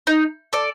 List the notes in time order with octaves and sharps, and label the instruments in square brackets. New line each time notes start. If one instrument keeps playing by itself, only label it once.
[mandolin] D#4
A4 D5